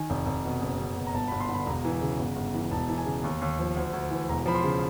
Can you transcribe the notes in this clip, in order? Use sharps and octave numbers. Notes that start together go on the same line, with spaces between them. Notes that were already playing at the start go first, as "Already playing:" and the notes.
Already playing: D#3 G#5
F1
F1
B2
F#1
F#1
B2
A#5
G1 A5
G1 B5
C6
D3
B5
E1 A#5
E3
C#3
G1
G1
E3
E1 A5
E3
G#5
C#3
D#2
D#2
F3
D2
D2
E3
E1 A#5
F3 B5
C6
C#3